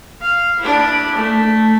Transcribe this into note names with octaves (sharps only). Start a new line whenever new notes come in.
F5
D4 E4
A3